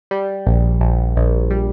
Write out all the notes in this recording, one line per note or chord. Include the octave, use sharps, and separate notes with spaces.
G3
A#1
A#1
A#1
G3